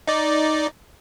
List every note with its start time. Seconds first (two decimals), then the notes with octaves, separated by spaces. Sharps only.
0.07 D#4 D5